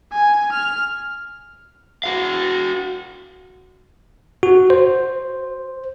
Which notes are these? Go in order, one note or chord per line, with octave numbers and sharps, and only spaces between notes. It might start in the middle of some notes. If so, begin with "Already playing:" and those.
G#5
F6
F#4 F5
F#4
C5